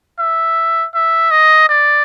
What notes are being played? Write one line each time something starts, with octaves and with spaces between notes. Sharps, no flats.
E5
E5
D#5
D5